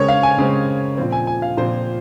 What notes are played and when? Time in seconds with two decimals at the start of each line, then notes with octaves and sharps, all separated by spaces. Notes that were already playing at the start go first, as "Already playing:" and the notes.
Already playing: C#3 G#3 C4 A#4 C#5
0.08 F5
0.23 G#5
0.38 C#3 G#3 C4
0.97 A#2 F3 C4
1.12 G#5
1.27 G#5
1.42 F5
1.57 A#2 F3 C4 C5